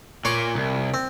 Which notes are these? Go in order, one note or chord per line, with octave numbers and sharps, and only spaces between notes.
A#2 C#5 C6 D6
C2
C4